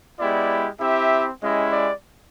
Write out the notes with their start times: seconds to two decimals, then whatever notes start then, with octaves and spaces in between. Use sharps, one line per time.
0.19 G#3 B3 E4 G4 D5
0.80 C4 E4 G4 E5
1.42 G#3 C#4 E4 G4 D#5
1.71 D5